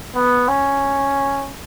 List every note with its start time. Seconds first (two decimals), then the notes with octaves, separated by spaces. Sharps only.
0.15 B3
0.48 C#4